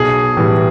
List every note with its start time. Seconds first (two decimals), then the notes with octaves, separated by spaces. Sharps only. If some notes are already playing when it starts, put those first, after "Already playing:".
Already playing: B1 G#4
0.37 A2 E3 G3